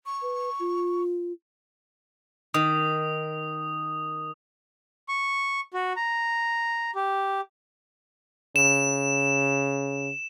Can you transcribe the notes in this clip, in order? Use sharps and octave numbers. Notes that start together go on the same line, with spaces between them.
C#6
B4
F4
D#3 D#6
C#6
F#4
A#5
G4
C#3 E7